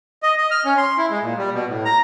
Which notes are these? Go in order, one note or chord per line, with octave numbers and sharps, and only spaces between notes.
D#5
D#5
F6
C#4
C6
E4
G#3
A#2
G3
B2
A2
A#5